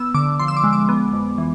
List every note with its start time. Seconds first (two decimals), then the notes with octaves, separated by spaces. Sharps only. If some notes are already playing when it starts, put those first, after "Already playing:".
Already playing: B3 E6
0.14 D3 D6
0.39 F3 C6
0.48 E6
0.57 D6
0.64 G#3
0.73 D6
0.89 B3
1.13 F2
1.38 E3